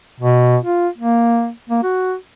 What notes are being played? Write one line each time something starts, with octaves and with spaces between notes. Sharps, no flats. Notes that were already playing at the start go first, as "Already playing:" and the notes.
B2
F4
A#3
A#3
F#4